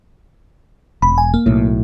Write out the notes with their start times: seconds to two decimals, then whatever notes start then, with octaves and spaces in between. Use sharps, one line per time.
1.02 E1 B5
1.18 G#5
1.34 A#3
1.46 B1 A2